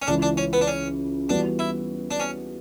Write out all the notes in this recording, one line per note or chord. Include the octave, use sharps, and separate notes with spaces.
C#4
C#2 C#3 E3 D4
D4
C#4
B3
D4
C#4
E3 G3 B3 D4 F#4
E4
D4
C#4